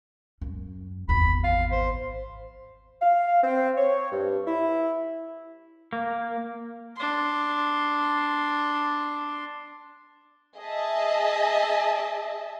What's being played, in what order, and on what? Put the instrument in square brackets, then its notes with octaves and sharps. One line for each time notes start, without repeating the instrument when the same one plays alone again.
[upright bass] F#2
[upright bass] G#1 E2 [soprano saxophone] B5
[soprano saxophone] F5
C5
[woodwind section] F5
C4
C#5
G2
E4
[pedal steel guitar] A#3
[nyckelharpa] D4 C6
[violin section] G#4 D#5 E5 A5